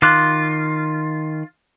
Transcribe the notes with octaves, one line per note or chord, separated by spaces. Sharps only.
D#3 F4 D6 F#6